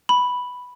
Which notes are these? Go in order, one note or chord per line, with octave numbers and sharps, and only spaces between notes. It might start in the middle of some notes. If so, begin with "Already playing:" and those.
B5